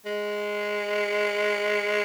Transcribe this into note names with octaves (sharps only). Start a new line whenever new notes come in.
G#3